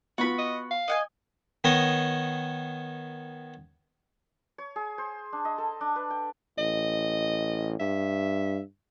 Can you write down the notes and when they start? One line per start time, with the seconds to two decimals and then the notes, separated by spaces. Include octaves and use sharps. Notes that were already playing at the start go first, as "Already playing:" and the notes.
0.18 B3 F4 F#4 B5
0.39 D#5
0.71 F5
0.88 D#5 F#5 G#5
1.64 D#3 B3 C#5 D#5
4.58 C#5
4.76 G#4
4.98 C5
5.33 D4
5.45 D#5
5.58 A4
5.81 D4
5.96 B4
6.10 G5
6.58 A1 D#5
7.80 G2 E5